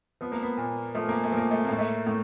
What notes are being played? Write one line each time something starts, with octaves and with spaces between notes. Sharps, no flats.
F3 B3
A#3
B3
A#2
F3 A3
A#3
A3
F3 A#3
A3
A2 A#3
A3
A2